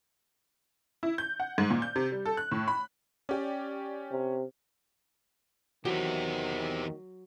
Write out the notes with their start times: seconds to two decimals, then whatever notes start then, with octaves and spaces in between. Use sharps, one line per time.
1.03 E4
1.18 G6
1.40 F#5
1.58 G#2
1.70 A#2
1.82 G6
1.96 C3
2.12 G3
2.26 A4
2.37 F#6
2.52 A2
2.68 B5
3.29 C#4 G4 D5
4.11 C3
5.85 E2 D#3 E3 F#3 G4 C5